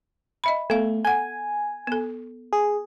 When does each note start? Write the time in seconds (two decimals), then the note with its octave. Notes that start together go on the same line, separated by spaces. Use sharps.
0.44 D#5 E5 B5
0.70 A3 B3 F5
1.05 A4 F#5 G#5
1.87 B3 A4
2.53 G#4